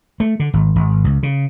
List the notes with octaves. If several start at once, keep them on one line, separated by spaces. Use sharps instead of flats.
A3
D3
G#1
G#1
C#2
C#3